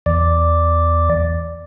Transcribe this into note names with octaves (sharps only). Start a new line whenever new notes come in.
E2 D5